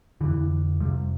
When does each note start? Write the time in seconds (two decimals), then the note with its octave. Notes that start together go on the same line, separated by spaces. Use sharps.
0.21 F2 D3 E3
0.80 F2 C3 G3